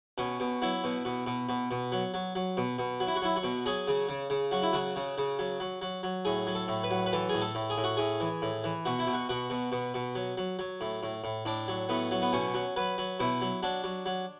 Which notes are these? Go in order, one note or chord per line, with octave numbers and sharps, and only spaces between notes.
B2 C#4
B2
F#3 E4
B2
B2
B2
B2
B2
F#3
F#3
F#3
B2
B2
F#3
E4
F#4
F#3 E4
F#4
B2
F#3 G#4
C#3
C#3
C#3
F#3 F#4
E4
C#3 F#4
C#3
C#3
F#3
F#3
F#3
F#3
A2 G#4
F#3
A4
A2
B4
F#3
B4
E3 A4
G#4
A2
A4
A2
G#4
A2
F#4
A2 G#4
E3
A2
E3
B2 F#4
E4
B2
F#4
B2 F#4
B2
B2
B2
F#3
F#3
F#3
A2
A2
A2
A2 D4
F#3
A2 B3
F#3
B3
B2 C#4
F#3
F#3 B4
F#3
B2 E4
F#3
F#3 D4
F#3
F#3